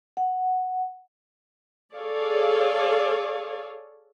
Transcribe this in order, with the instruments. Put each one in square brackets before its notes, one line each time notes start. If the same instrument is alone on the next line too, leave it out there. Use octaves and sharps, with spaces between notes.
[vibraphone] F#5
[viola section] G#4 A4 C#5 D5 F5